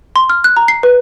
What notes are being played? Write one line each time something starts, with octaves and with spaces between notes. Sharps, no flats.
C6
F6
F#6
A#5
C7
B4